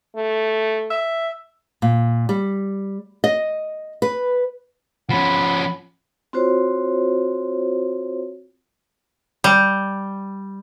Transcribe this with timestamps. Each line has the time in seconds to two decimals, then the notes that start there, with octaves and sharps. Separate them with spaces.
0.16 A3
0.90 E5
1.82 A#2
2.29 G3
3.24 D#5
4.02 B4
5.10 F3 C#4 F#5 B5
6.33 C4 F4 F#4 C5 C#5
9.44 G3